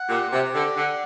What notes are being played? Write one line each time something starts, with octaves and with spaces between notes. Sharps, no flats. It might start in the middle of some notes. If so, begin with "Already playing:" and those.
Already playing: F#5
A#2 G4
C3 G4
D3 D5
D3 F#5